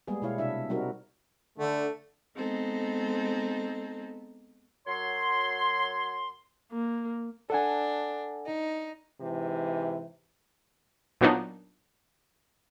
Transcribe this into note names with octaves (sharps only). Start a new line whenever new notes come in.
G3 G#3 A#3 B3 G#4
B2 G#3 E4 C#5 F5
C3 D4 E4 E5
G3 C4 D#4 F#4 A#4
D3 A3
G#3 B3 C4 D#4 A4
F#2 F#3 C#5 C6
A#3
D4 A4 F#5 G#5
D#4
G#2 C3 E3
A#2 F#3 B3 D4 D#4